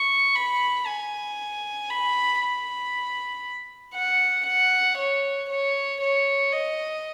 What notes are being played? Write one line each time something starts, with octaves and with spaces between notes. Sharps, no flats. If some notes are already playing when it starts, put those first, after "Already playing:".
Already playing: C#6
B5
G#5
B5
B5
F#5
F#5
C#5
C#5
C#5
D#5